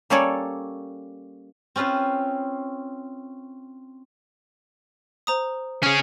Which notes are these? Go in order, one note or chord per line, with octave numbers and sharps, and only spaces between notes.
G3 A#3 C#4 A4 C#5 D5
C4 C#4 F4 B4 C5
C5 A#5 D#6
C#4 G#4 F6